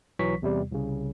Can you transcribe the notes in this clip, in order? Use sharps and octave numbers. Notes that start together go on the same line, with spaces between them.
B1 E3 F#3 C#6 B6
E2 C3 G3
C2 C#3